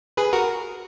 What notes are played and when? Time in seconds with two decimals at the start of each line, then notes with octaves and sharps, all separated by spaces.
0.17 G#4 B4
0.33 F#4 A#4